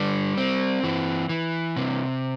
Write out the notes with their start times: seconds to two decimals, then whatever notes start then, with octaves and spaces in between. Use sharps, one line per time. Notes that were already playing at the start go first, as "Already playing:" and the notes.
Already playing: D3 G3
0.37 C4
0.84 E3
1.29 E3
1.77 C3